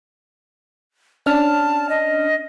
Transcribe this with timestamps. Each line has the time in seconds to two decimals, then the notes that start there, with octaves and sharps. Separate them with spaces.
1.26 C#4 D4 A5 F6
1.89 D#5